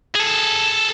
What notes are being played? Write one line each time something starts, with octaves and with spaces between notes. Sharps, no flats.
G#4 A4